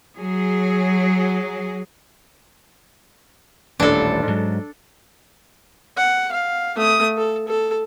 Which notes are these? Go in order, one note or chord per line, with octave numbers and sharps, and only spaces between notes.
F#3 G#4
D#1 A1 E3 D4 A4
G#2 F#3
F#5
F5
A3 D#6
A4
A4